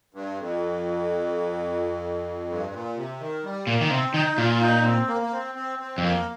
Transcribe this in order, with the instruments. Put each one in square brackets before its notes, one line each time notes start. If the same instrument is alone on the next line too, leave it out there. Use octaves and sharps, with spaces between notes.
[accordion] G2
F2
G2
A#2
C3
D#3
G3
[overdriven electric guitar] A#2 [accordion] A#3
[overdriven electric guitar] D#3
[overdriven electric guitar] C3 [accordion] C4
[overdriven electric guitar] D#3 [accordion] D#4
[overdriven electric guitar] A#2 [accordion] F4
[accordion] D#4
C4
A#3
A#3
C4
C4
C4
[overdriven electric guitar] F2 [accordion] A#3